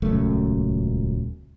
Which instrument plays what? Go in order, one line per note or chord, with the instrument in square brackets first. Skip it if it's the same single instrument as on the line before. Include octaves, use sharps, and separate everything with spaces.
[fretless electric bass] D#1 C#2 F#2 A3